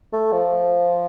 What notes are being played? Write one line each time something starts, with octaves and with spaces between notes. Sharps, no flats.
A3
F3